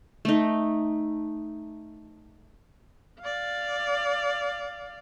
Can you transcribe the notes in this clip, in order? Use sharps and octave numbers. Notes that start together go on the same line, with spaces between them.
A3 D#4
D5 F5